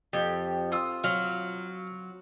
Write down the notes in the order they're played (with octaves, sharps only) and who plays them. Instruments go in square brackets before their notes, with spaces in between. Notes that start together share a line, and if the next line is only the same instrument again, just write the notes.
[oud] F2 [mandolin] G4
[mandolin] F4 D#6 E6
[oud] F#3 [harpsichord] F5